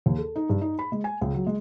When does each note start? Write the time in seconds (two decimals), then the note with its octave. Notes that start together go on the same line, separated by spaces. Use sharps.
0.06 D#2
0.18 A4
0.36 D#4
0.49 G2
0.61 D#4
0.79 B5
0.92 G#3
1.04 G#5
1.21 C#2
1.34 F#3
1.47 G#3